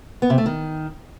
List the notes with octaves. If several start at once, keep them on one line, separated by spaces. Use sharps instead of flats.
B3
C3
A3
D#3